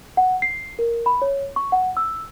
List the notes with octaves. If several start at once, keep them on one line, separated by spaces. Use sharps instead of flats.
F#5
C7
A#4
B5
C#5
C#6
F#5
E6